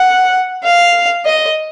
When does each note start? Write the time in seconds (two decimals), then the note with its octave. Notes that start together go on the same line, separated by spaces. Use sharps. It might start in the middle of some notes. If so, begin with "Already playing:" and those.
Already playing: F#5
0.64 F5
1.26 D#5